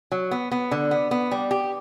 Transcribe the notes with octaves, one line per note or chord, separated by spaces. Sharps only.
F#3
B3
B3
D3
B3
B3
G3
G4